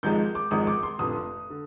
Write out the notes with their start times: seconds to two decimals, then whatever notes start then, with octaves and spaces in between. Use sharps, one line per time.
0.03 G#1 G#2 F3 G#3 G6
0.35 D6
0.51 G#1 G#2 F3 G#3 D#6
0.67 D6
0.83 C6
0.99 F1 F2 D3 D#6
1.50 D3